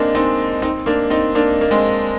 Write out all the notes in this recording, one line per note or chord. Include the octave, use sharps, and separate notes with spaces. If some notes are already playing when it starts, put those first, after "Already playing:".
Already playing: G#3 A#3 C4 D4 D#4
C4 D#4
C4 D#4
A#3 D4
C4 D#4
A#3 D4
A#3
G#3 C4